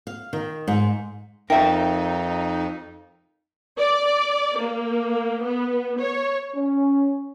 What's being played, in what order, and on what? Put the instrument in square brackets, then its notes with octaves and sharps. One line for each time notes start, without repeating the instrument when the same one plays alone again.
[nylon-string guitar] F5
D#3
G#2
[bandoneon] F2 [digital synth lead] D#4 [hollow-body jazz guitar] A#4 E5 [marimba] G5
[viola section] D5
A#3
B3
C#5
[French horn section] C#4